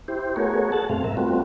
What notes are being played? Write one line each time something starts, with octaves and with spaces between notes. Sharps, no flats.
E4 G4 C5
A3 B3 F#4 G#4 A#4 C#5
G#4 A4 F#5 A5
F#2 B2 A3 C4 F5
G#2 A#4 E5
G3 A3 B3 C4 F4 F#4